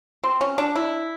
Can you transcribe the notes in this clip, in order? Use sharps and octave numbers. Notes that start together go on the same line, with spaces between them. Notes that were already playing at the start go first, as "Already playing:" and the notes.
C4
C#4
D4
E4